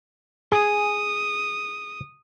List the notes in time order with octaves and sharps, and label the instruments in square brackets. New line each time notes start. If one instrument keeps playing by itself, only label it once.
[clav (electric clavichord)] G#4 [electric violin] D#6